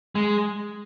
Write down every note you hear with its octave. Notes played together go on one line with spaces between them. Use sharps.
G#3